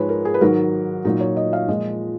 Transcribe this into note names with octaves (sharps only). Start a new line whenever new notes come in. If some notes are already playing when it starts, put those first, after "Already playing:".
Already playing: G#2 F3 G#3 B4 C#5
A#4
G#4
B4
G#2 D#3 F#3 A#4
A#2 F#3 D#4
C#5
D#5
F5
A#2 F3 G#3 D#5